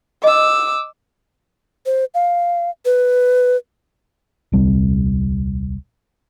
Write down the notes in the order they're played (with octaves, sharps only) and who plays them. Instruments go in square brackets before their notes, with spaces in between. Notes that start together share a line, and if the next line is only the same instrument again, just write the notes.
[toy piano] D#5 [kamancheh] D6 E6
[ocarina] C5
F5
B4
[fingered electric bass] D#1 C2 G3 C4